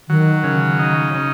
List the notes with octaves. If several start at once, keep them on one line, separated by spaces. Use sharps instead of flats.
D#3 F#3
C#3
D#4
C#3